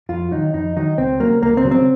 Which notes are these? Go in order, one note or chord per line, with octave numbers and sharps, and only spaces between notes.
F2 F4
D#3 F#3 D#4
F2 D#4
D#3 F#3 D#4
C#2 C4
C#3 F#3 A#3
C#2 A#3
C4
C#3 F#3
C4